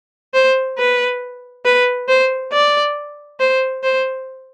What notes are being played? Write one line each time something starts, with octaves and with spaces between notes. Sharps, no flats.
C5
B4
B4
C5
D5
C5
C5